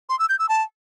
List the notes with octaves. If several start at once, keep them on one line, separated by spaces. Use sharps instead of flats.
C6
E6
G6
E6
A5